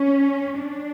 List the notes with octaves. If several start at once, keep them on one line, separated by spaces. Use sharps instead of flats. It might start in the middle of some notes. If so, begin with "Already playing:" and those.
Already playing: C#4
D4